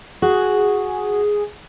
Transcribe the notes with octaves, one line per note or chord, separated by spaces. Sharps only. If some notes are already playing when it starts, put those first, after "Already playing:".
F#4 G#4